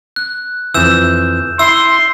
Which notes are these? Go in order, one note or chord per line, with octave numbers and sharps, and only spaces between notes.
F#6
F2 E3 E6 G6 E7
E4 C6 E6